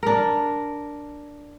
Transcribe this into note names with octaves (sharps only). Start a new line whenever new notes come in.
D4 A#4